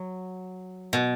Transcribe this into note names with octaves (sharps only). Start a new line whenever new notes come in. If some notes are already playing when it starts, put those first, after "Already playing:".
Already playing: F#3
B2